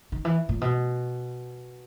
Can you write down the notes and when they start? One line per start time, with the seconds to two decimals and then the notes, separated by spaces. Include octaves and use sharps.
0.12 D#3
0.25 E3
0.49 A#2
0.61 B2